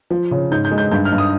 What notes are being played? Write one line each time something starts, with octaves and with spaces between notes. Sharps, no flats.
F3
C#3
G#2 G6
G6
G#3
G6
G2 G6
F6
G2
D#6